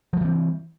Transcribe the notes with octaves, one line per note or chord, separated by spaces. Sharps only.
E3 F3 G3 C4